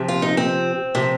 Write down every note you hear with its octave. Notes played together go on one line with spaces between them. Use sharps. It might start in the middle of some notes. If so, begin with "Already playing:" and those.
Already playing: C3 F3
F4
D#4
C4
C3 F3